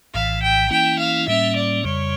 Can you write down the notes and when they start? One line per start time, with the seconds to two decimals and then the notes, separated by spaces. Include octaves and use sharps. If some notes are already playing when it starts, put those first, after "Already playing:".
0.14 A#1 A2 E3 F5
0.42 G5
0.70 E3 A#3 C#4 E4 G5
0.99 F5
1.27 A2 G3 A#3 C#4 E5
1.56 D5
1.84 F2 C#3 G3 C#5